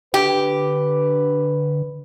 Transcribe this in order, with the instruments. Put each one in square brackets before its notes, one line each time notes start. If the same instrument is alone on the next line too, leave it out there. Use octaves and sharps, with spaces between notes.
[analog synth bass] D3 [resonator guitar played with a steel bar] G4 [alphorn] B4